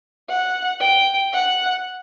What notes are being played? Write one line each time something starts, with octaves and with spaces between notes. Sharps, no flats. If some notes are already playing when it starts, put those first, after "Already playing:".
F#5
G5
F#5